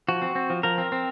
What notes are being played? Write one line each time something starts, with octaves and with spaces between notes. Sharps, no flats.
F3 F#4
C4
C4
F3
F3 A#4
C4
C4